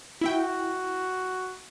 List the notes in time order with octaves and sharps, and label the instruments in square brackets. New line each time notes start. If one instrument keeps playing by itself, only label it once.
[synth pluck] E4 E5 G5 [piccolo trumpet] F#4